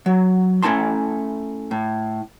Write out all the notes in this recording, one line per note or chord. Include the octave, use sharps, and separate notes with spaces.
F#3
A3 C#4 E4 A5 C6
A2